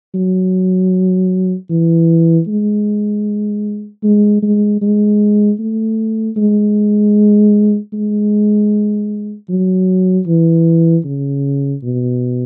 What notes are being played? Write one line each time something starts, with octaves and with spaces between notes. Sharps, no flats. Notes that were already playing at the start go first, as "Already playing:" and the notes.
F#3
E3
G#3
G#3
G#3
G#3
A3
G#3
G#3
F#3
E3
C#3
B2